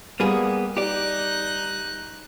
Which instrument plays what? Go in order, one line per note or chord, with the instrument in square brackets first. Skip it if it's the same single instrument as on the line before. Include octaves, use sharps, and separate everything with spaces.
[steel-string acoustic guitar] G3 [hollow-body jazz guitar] A#3 B3 G#4
[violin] D#4 F#6 [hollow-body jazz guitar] G4 D5